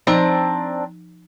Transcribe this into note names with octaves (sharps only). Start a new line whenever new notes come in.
F3 C4 D4 D#4 A#5